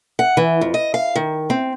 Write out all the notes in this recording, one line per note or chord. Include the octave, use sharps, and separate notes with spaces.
F#5
E3
F2
D#5
F5
D#3
C4